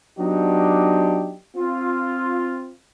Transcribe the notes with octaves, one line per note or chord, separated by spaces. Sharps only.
F#3 B3 D4 D#4 G4
C4 F4